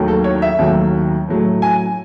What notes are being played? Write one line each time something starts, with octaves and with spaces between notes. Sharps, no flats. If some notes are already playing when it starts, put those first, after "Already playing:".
Already playing: D#2 D#3 F#3 A3
A4
C#5
E5
D#2 D#3 F#3 A3
A2 F#3 A3
G#5